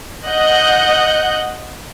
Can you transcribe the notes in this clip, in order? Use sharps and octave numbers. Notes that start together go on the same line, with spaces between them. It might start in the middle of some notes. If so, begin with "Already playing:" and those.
D#5 F#5 F#6 G6